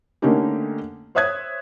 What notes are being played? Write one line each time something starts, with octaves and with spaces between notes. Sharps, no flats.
D3 A3 A#3 C#4 D#4 G4
C5 C#5 E5 D#6 F#6 G#6